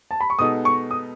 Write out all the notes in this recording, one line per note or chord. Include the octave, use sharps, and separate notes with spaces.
A5
B5
C#6
B2 G#3 B3 D#4 A4 D#6
C#6
D#6